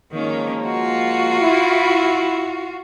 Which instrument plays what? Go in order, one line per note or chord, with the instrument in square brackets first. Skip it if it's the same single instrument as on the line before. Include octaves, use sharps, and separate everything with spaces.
[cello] D#3 C#4 [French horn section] F3 G#3 A#3
[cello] F4 F#4
[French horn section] E4